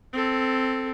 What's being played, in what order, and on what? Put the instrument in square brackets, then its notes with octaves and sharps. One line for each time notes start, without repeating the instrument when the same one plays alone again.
[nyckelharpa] C4 A4